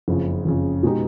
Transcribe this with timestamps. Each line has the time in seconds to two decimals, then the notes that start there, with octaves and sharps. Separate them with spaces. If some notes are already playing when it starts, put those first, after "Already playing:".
0.08 F#1 F2 C#3
0.45 F#1 F2 C#3
0.83 B2 G#3 B3 D#4 G4